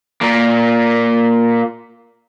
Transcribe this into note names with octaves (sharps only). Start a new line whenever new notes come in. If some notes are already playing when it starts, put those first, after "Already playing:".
A#2 A#3